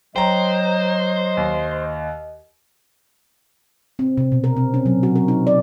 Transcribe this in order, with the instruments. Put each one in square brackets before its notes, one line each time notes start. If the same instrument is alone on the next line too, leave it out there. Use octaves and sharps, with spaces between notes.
[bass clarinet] F#3 [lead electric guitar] C5 [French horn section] D#5 [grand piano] G5 A#5
[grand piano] D#2
[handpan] C4
C3
B2
A#4
C4
C#4
F#3
F#4
A#4
D#4
D5